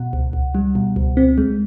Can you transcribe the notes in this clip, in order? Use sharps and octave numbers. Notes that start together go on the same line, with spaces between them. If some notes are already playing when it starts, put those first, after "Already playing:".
Already playing: B2 F#5
C#2
C#2
G3
B2
C#2
C4
G#3